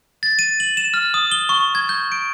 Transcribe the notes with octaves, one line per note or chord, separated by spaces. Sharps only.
A6
D#7
F#7
E7
F6
D#6
G7
C#6
G#6
G6
D7